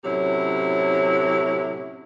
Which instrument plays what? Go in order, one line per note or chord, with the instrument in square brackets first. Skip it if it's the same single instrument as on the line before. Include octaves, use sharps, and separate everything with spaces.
[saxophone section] A2 C3 F#3 C#4 E4